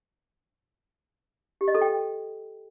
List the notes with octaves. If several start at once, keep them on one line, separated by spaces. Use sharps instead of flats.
G4
D#5
A4
G5